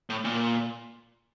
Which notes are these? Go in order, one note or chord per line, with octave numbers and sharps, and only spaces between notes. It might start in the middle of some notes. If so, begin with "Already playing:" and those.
A2
A#2